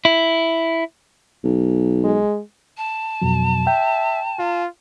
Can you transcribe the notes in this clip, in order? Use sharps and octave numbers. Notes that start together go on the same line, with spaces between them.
E4
B1
G#3
A5
F2 B2 F#3
E5 G5
F4